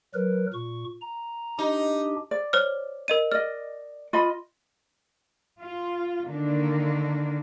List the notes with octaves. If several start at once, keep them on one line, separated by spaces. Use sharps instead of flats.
F#3 A#4 B4
A#2 C#6
A#5
D4 D#4 G4
D5
C5 C#5 F6
A#4 D#5 D#7
D5 D#5 F6
F4 D#5 B5
F4
D3 D#3 A#3 D4